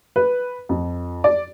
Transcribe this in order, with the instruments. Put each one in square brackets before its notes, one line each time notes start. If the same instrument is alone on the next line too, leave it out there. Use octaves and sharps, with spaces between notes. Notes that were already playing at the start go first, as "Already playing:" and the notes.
[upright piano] B4
F2
D5